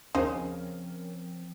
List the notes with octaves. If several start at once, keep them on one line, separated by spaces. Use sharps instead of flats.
D#2 C#3 F3 C4 C#4 A#4 C5 D#5